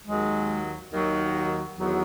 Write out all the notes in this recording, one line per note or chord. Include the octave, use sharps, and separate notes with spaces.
D#2 D#3 F#3 G#3
D#2 D#3 F#3
E2 D#3 F#3